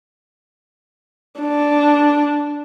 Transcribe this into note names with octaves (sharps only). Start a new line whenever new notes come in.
D4